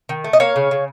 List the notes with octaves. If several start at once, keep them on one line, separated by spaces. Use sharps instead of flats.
D#3
A3
D#5
A#3 C#5 F5
C#3
C#3